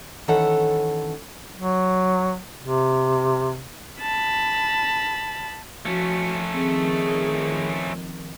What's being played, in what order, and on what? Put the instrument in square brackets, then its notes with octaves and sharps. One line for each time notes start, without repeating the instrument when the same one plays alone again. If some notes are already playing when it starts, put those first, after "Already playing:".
[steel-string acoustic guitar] D#3 E3 C#4 A4 C#5 F#5
[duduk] F#3
C3
[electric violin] A5 B5
[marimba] F3 [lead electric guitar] A3 C#4 [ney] F#4
[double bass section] D#3 F3 [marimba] C4 [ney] G#4